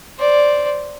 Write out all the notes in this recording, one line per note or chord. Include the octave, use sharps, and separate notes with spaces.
C5 D5